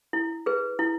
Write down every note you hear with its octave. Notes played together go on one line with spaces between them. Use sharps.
E4
G#4 B4
E4